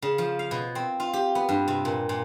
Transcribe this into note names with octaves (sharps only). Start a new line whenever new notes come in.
C#3
F3
F5
B2
C4
F4
G4
B3
G2
C3
A#2
A#2